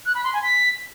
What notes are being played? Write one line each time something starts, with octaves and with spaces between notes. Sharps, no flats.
F#6
B5
C6
G#5
B6